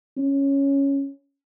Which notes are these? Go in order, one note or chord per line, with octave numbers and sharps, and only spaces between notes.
C#4